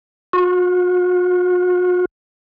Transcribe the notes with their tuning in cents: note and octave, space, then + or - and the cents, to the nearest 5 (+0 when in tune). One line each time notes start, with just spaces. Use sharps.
F#4 -45